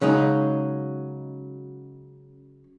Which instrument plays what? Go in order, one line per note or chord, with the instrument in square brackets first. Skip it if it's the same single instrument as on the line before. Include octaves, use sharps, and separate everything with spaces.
[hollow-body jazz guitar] C#3 F#3 G#3 D#4